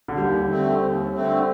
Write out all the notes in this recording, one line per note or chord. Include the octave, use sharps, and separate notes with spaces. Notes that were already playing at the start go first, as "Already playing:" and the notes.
D3
D#2 G3
D3 A3 C4
D#2
D3 A3 C4